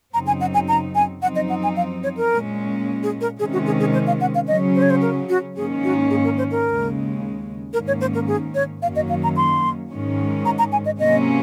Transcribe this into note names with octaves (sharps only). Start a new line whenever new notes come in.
F#2 C#3 F#3 C4 D#4 A#5
G#5
F#5
G#5
A#5
G#5
F#2 F3 C4 D#4 F#5
D#5
F#5
G#5
F5
C#5
A#4
A#2 G#3 C#4
G#4
A#4
C3 D#3 G#3 C#4 G#4
F#4
G#4
G#4
C5
F5
F#5
F5
C#3 F#3 C#4 D#5
C5
C#5
C5
A#4
F#4
G#2 D#3 A#3 C#4 G#4
F#4
G#4
A#4
C5
A#4
D#2 C#3 G#3
G#2 D#3 A#3 C#4 A#4
C#5
C5
A#4
G#4
C#5
F#2 D#3 F#3 A#3 C#4 F5
D#5
F5
A#5
C6
G#2 D#3 G#3 C#4
A#5
A#5
G#5
D#5
C3 F#3 A#3 C#4 D#5